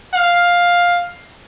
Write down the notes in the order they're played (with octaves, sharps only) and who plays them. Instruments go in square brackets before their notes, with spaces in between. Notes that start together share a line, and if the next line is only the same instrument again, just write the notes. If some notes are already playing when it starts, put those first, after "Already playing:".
[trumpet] F5